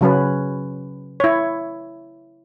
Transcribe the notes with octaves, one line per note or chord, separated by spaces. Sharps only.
C#3 F#3 C#4 B4
E4 C#5